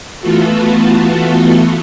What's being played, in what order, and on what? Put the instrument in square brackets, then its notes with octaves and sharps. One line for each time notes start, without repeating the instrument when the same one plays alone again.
[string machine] E3 A3 B3 F4 F#4 A4